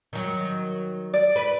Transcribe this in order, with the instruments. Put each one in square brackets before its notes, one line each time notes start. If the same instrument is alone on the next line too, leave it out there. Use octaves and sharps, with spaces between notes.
[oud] D#3 F#3
[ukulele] D5
[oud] B4